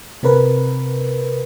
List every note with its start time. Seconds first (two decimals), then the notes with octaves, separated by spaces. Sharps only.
0.23 C3 C4 A#4 B4